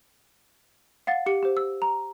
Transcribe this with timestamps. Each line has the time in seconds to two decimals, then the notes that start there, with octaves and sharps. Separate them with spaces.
1.07 F5 F#5 A6
1.26 G4 C#7
1.43 G4 C5
1.57 E6
1.82 A#5